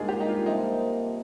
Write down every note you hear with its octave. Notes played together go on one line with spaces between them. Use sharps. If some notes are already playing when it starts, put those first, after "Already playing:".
Already playing: G#2 G3 A#3 D4 D#4 F4 G#4
G4
D#4
F4
C3 F3 A#3 D#4